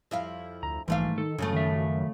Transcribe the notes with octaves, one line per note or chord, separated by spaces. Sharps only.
F2 E4 F5
D2 A#5
A#1 G#2 E3 A3 F5
D#3 A4
F#2 C#3 F3 A3
D#3 E5